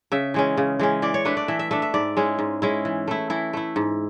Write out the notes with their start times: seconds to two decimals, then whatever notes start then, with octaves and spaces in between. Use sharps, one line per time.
0.12 C#3 E5
0.34 E3 G#3 C#4
0.57 C#3
0.79 E3 G#3 C#4
1.02 E3 D5
1.14 C#5
1.25 A3 D4 B4
1.37 D5
1.48 E3 E5
1.59 E5
1.71 A3 D4 E5
1.82 E5
1.94 G#2 D5
2.17 G#3 C#4 E4
2.39 G#2
2.62 G#3 C#4 E4
2.85 E3
3.08 A3 E4
3.30 E3 E4
3.53 A3 E4
3.76 G#2